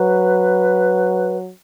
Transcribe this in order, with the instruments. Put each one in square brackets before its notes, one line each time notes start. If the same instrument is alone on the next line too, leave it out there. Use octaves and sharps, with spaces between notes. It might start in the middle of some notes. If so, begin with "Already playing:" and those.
Already playing: [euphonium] F#3 [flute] B4